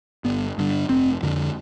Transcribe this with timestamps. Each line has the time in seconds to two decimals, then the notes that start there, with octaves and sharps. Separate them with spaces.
0.24 G1 B3
0.58 G2 D3
0.89 F1 C4
1.23 F2 D3